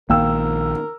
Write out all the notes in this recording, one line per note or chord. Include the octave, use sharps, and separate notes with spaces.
A#1 D#3 A#3 A#4 F5 G5 E6